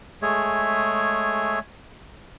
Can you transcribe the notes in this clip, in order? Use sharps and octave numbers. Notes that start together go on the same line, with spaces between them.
G#3 A3 G#4 C#5 E5